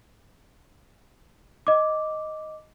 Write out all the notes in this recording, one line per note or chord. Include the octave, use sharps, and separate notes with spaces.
D#5 D6